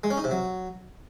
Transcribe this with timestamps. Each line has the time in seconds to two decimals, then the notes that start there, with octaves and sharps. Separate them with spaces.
0.04 G#3
0.10 C#4
0.17 D#4
0.24 C3
0.31 F#3